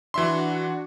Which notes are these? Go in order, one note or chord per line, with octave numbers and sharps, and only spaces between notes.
E3 D4 F#4 E5 C6